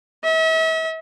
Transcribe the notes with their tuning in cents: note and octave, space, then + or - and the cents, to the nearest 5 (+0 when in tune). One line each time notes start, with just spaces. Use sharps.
E5 -40